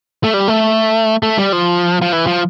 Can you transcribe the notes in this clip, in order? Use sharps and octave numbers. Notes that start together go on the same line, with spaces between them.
A3
G3
A3
A3
G3
F3
F3
E3
F3